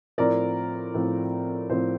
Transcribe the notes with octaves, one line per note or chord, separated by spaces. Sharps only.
A2 F3 C4 A#4 D5
A2 F3 C4
A2 F3 C4 C5